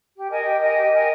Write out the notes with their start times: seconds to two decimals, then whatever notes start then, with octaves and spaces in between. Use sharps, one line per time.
0.15 G4
0.30 A#4 D#5 G#5
0.45 G4
0.62 A#4 D#5 G#5
0.77 G4
0.93 A#4 D#5 G#5